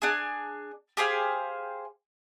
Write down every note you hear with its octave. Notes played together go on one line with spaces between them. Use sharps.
D4 G#4
G4 G#4 C5 F5